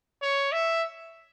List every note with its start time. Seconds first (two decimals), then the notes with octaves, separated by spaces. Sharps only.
0.22 C#5
0.52 E5